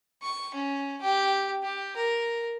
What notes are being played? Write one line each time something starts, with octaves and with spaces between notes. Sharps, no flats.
C#6
C#4
G4
G4
A#4